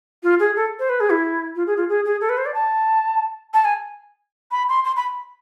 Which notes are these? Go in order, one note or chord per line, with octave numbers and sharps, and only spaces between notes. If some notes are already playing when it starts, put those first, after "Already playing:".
F4
G#4
A4
C5
B4
G#4
E4
F4
G#4
F4
G#4
G#4
A4
B4
C5
D5
A5
A5
G#5
B5
C6
C6
B5